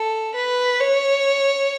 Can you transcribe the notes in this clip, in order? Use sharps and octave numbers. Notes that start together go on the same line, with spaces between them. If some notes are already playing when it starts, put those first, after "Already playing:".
Already playing: A4
B4
C#5